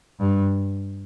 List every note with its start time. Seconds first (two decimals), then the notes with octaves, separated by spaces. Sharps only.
0.19 G2